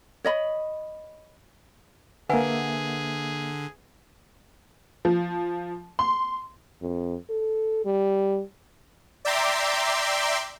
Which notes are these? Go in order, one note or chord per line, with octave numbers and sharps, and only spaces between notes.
C#5 D#5 B5
D3 A#3 G#4 B4 E5 F#5 G#5
F3
C6
F2
A4
G3
D5 E5 G5 A#5 C6 D6